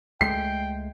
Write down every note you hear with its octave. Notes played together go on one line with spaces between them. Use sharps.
C#2 G#3 A3 G5 C7